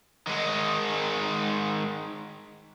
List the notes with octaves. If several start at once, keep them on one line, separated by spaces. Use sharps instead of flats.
D#3 G#3